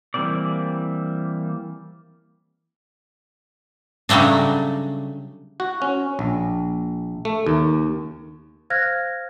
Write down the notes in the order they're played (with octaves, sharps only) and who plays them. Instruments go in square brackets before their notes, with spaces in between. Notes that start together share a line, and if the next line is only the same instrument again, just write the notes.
[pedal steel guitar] E3 G3 A#3 C4 D5
[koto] C#3 F#3 G3 A3 D4
[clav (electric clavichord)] F#4
C#4
A#1
A3
D#2
[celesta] C5 F5 F6 F#6 G#6 A#6